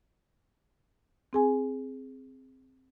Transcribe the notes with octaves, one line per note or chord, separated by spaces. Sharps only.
C4 G#4 G#5